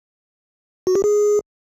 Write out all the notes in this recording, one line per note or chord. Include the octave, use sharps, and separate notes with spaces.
F#4
G4
G#4